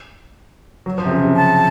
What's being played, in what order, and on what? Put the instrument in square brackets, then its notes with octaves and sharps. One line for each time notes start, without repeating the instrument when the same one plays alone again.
[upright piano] F#3
F3
C3
C#3
C3
[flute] A5